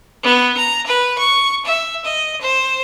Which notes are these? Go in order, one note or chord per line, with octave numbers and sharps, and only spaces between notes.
B3
A#5
B4
C#6
E5
D#5
C5